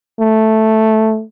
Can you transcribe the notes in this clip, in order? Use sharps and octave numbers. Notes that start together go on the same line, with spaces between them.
A3